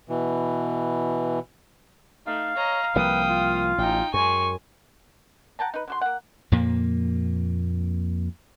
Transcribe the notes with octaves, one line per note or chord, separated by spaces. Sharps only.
B2 E3
A3 D#4 F5
C#5 D#5 A#5
C2 F3 A#3 B4 G5 D#6
F4
A1 D#4 G5
F#2 G#3 G#5 C#6
F#5 G5 A5 A#5
D#4 B4
D3 F#4 C6
A#3 F#5
F2 A#2 A#3